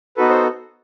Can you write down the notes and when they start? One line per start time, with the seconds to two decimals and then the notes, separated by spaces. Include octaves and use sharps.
0.17 B3 D#4 F#4 A4 B4
0.30 C5